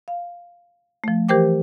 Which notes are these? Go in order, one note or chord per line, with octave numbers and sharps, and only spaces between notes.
F5
F3 A3
E3 G4 A#4 C5 G5 D6